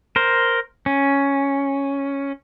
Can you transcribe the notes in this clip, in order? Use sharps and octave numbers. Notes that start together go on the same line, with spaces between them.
A#4 C5
C#4